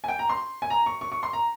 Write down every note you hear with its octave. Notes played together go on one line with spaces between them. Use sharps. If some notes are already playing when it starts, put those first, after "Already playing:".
G#5
G5
A#5
C6
G#5
A#5
C#6
C#6
C#6
C6
A#5